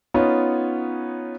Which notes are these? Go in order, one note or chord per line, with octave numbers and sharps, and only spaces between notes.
B3 C#4 D#4 F4